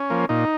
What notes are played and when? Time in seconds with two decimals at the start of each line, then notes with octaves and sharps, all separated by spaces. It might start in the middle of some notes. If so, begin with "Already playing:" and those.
Already playing: C#4
0.10 F3 A#3
0.29 A#2 D#4